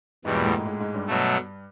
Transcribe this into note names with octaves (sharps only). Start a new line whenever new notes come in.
E2 G#2 B2 G3 G#3
A#2 A#3
A2 A3
G#2 G#3
G#2 G#3
G#2 G#3
G2 G3
B2 F#3 A3